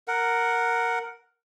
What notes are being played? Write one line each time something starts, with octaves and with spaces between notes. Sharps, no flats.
A#4 F#5